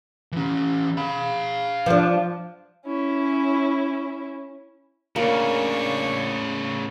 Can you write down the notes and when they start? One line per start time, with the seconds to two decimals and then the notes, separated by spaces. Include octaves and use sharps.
0.32 E3 C#4
0.97 F5 B5
1.86 F3 D4
2.86 C#4 E4
5.16 A2 C#3 A#3 D4 C#5